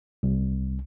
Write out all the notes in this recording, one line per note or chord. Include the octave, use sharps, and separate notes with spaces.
C2